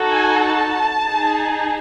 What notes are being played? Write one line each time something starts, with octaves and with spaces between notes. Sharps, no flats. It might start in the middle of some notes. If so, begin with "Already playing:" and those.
Already playing: D#4 F#4 A4
G#5
A5
D#4 G#4